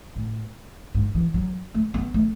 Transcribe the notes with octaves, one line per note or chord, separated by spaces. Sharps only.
A2
G#2
E3
F#3
A3
B3
A3